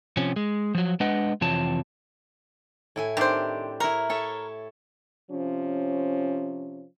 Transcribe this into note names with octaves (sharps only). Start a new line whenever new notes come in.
C3 F3 C#4
G#3
F3 F#3
G#3 D4 B4 D#5 F#5
F2 C3 E3 F4 C#5 A5
A2 E4 G#5
D#3 C4 D4 G4 C5
E4 A#4 C#5
A4 C#5 E5
C3 F3 C#4